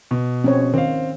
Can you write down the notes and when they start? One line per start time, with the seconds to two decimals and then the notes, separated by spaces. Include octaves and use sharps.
0.11 B2
0.44 C4 C#4 C#5
0.74 D#3 C4 F5